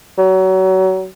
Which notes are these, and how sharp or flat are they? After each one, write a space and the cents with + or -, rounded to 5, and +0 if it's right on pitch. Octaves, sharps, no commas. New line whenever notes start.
F#3 +30